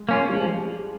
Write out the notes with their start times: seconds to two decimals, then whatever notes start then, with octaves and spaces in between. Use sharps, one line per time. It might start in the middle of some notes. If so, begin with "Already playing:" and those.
Already playing: G#3
0.09 A#3 C#4 F4
0.29 G3
0.33 F3 G#3
0.47 G3